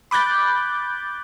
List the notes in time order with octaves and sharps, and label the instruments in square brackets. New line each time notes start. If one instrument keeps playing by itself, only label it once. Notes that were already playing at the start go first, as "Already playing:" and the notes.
[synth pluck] B5 D6 F#6 G6 A6